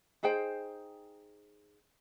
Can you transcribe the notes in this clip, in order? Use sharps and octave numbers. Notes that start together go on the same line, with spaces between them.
D#4 G#4 C5 G5